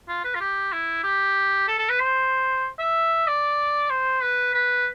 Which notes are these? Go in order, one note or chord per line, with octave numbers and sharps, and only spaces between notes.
F4
B4
F4
G4
E4
G4
A4
A4
B4
C5
E5
D5
C5
B4
B4